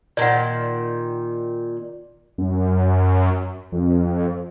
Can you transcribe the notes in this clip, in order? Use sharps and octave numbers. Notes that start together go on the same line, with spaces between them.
A#2 D#3 D5 F#5
F#2
F2